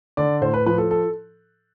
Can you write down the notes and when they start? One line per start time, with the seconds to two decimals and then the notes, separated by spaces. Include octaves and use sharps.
0.17 D3 D5
0.41 A2 C5
0.54 B4
0.66 F3 B4
0.78 A4
0.91 A4